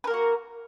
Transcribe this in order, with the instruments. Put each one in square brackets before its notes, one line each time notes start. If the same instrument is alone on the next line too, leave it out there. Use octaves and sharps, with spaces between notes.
[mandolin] B4
A#4
A#3
F#4